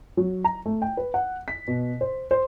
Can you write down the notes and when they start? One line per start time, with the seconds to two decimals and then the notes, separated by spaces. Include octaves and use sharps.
0.17 F#3
0.44 A#5
0.66 A3
0.82 G5
0.97 B4
1.14 F#5
1.48 B6
1.68 B2
2.01 C5
2.31 C5